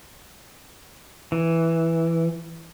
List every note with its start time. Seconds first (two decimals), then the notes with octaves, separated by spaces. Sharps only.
1.32 E3